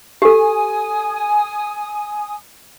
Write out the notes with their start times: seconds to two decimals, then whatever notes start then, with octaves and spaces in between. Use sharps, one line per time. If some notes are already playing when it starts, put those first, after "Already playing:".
0.22 G4 A4 G#5 D#6